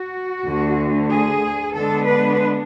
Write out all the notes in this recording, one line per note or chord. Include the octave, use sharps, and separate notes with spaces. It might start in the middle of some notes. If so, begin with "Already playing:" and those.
Already playing: F#4
D2 D3 A3
G#4
D3 G#3 B3 D4 A4
B4